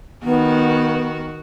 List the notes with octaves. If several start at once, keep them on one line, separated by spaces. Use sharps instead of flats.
D#3 B3 F#4